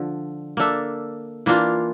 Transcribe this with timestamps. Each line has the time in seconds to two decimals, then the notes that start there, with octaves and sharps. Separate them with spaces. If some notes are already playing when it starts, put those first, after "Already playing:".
Already playing: D3 F3
0.57 A#3 D4 A4 E5
1.46 E3 A#3 D4 F4